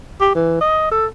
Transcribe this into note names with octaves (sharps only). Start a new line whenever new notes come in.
G4
E3
D#5
A4